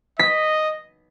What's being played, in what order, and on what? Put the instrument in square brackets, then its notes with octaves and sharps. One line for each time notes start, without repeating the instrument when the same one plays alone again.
[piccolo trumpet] D#5 [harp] B6